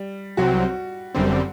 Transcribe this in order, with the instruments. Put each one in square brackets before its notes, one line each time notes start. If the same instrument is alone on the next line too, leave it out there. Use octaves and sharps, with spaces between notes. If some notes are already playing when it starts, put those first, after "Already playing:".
Already playing: [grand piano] G3
[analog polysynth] C2 C3 F#3 C4 [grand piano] F#4
[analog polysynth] G1 F#2 D3 G3 C4